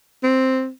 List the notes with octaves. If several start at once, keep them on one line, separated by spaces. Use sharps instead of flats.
C4